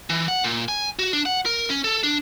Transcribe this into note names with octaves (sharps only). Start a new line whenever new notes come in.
E3
F#5
A#2
G#5
F#4
D4
F#5
A#4
C#4
A4
D4